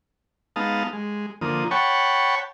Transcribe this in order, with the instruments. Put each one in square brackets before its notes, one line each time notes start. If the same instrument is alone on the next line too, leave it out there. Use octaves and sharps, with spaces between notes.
[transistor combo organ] G#3 B3 D#4 F5 A5 D#6
G#3
D3 F3 A#3 D#6
C#5 F#5 G5 A5 B5 C#6